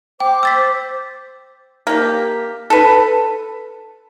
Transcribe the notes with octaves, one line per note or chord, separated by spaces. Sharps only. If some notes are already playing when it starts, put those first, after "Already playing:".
C5 G5 D6
E6 A6 B6
A#3 G4
A4 B4